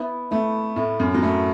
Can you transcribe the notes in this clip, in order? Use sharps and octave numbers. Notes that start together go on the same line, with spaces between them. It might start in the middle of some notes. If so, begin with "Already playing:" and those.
Already playing: B3 E4
A3 E4
A2 E4
F#2
F#3
A3 E4